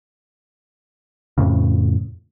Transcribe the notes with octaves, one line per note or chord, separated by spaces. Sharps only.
F2 A2 C#3